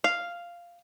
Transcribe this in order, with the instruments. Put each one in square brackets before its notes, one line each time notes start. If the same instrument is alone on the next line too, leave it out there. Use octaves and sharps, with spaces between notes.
[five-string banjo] F5